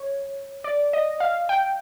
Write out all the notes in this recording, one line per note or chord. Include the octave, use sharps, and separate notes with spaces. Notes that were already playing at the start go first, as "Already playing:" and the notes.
Already playing: C#5
D5
D#5
F5
G5